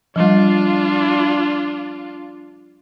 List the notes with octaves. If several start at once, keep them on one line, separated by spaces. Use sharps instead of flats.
F3 G3 D4 F4